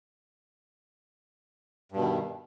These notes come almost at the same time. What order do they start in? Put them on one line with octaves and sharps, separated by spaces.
G2 B2 D#3